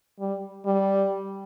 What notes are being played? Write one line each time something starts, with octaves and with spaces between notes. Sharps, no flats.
G3
G3